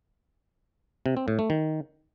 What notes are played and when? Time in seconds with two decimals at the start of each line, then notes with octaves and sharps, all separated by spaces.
1.06 C3
1.17 C4
1.28 A2
1.39 A3
1.50 D#3